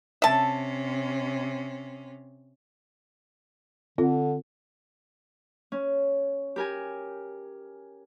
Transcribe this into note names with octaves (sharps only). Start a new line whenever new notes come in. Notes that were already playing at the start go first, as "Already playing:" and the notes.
C3 C#4 E5 A5
D3 C4 F4 A4
C#4
G4 A#4 G#5